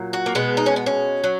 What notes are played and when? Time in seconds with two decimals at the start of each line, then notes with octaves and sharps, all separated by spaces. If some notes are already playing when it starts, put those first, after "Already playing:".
Already playing: A#2 F#3
0.13 F#4
0.26 A#3
0.35 B2 G#3 B3
0.57 D#4
0.66 C#4
0.76 B3
0.86 C#4
1.24 F#3